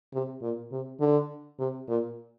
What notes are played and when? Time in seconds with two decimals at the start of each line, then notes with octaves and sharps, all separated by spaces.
0.13 C3
0.42 A#2
0.72 C3
1.00 D3
1.59 C3
1.89 A#2